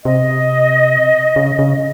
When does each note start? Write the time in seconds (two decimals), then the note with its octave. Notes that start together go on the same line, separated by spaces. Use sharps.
0.05 C3 D#5
1.36 C#3
1.59 C#3